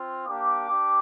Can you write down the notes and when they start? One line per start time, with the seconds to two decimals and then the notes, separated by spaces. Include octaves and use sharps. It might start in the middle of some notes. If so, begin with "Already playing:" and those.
Already playing: C4 F4
0.26 A#3 D4 G4 D6
0.68 D4 G4